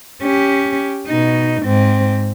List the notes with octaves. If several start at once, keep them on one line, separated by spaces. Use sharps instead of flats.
C#4 G4
B2 D#4
G#2 C4